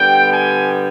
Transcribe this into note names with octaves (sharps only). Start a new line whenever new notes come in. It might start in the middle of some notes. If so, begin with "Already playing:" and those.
Already playing: D3 G3 B3 G5
G#5